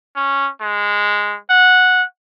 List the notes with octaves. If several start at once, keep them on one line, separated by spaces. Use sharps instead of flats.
C#4
G#3
F#5